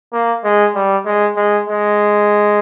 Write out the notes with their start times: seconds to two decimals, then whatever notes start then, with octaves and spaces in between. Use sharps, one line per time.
0.13 A#3
0.44 G#3
0.75 G3
1.06 G#3
1.37 G#3
1.67 G#3